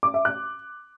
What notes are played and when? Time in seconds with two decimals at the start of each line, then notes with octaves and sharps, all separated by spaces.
0.03 D6
0.14 E5
0.25 F#6